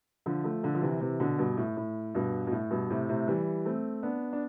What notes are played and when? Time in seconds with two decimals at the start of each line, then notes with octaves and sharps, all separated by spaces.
0.26 D3 F3
0.44 F3 A3
0.63 D3 F3
0.75 F3
0.82 C3 E3
1.00 C3 E3
1.20 B2 D3
1.39 G2 B2
1.57 A2
1.77 A2
2.15 G2 B2
2.47 B2
2.52 A2
2.71 G2 B2
2.90 A2 C3
3.09 A2 C3
3.27 E3 G3
3.66 A3 C4
4.03 B3 D4
4.33 D4